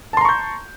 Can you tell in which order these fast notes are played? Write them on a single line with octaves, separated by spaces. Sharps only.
A5 C6 A#5 C#6 G6